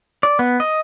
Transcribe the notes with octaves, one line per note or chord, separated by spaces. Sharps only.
D5
B3
D#5